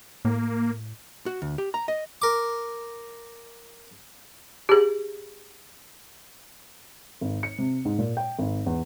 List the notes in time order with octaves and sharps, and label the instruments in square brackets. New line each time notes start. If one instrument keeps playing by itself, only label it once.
[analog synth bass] A2 [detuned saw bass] A#3
[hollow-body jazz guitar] F#4
D2
G4
A#5
D#5
[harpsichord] A#4 D6
[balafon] G4 G#4
[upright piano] G#1
C#7
C3
G#2
A#2
G5
G#1
E2